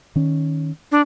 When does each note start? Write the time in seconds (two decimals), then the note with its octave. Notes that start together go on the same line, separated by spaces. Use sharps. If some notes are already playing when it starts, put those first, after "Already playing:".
0.16 D#3 C#4
0.92 D4